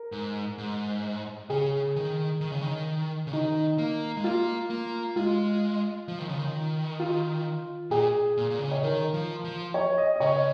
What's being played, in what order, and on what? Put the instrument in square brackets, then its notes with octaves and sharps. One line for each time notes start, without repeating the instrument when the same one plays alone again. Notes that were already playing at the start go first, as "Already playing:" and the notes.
Already playing: [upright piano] A#4
[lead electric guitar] G#2
G#2
[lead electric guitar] C#3 [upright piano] G#4
[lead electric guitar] D#3
D#3
C#3
D#3
C#3
[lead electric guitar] D#3 [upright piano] D#4
[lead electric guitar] A#3
G#3
[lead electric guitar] A#3 [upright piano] F4
[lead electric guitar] A#3
[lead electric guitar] G#3 [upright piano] F4
[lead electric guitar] F3
D#3
C#3
D#3
[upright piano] F4
[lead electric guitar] A#2 [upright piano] G#4
[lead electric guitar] A#2
A#2
C#3
[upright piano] C#5
[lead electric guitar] D#3 [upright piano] A#4
[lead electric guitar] F3
F3
[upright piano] C#5
D#5
D#5
[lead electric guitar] C#3 [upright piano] C#5